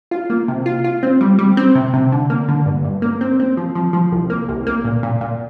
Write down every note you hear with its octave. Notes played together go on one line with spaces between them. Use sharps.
F4
A#3
C3
F4
F4
C4
G3
G3
C4
C3
C3
D3
A#3
D3
G2
G2
A#3
C4
C4
F3
F3
F3
C2
A#3
C2
A#3
A#2
A#2
A#2